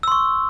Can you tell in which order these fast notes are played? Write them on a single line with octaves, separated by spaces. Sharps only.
E6 C6 C#6